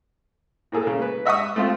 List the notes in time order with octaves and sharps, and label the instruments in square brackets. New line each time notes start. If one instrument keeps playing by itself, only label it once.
[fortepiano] A2 A#3 G#4 A4
C#3
B4
D#5 E5 F#5 C#6 D#6
A3 C4 F4